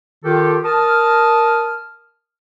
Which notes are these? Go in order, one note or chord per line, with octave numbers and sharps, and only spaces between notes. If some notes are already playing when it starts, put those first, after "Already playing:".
D#3 F4 G4 A4
A#4 A5 D#6 F6